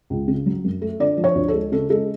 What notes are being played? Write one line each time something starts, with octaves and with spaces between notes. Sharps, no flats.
C#2
C#3
F#3
F#2
A3
D3 D5
F3
C#5
D2
G#3 A4
C#3 A4
G#3 A4